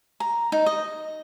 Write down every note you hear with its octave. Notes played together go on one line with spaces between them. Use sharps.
A#5
D#4
D#5